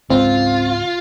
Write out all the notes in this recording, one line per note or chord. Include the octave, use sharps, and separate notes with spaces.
C#2 G#2 C#3 C4 F4